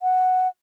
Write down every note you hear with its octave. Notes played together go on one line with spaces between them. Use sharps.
F#5